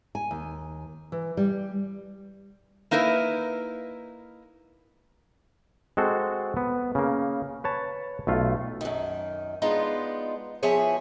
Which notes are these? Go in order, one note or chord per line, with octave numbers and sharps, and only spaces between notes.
G#5
D#2
E3
G3
A#3 D#4 E4 A#4 B4
G#3 C4 F#4 A4
B3
C#3 A#3
B4 C#5 A5
B1 A3 F4
F#2 D#3
G#3 B3 D4 D#4 F4
F3 B3 E4 G#4 C#5 G#5